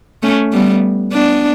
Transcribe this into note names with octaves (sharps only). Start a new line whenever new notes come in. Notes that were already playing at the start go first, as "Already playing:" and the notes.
A3 C#4
G3 B3
B3 D4